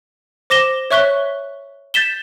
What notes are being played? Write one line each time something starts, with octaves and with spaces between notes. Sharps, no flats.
C5 D6 A#6 E7 G7
C#5 E5 C#6 F#6 B6 G7
G6 A6 B6 E7 G7